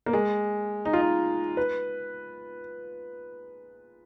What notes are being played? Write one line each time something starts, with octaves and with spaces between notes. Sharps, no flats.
A#3
G#3
D#4
F4
D#4
B4